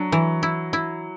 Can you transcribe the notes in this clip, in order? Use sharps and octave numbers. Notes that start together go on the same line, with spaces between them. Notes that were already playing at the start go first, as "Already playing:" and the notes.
Already playing: F#3 D4
E3
E4
E4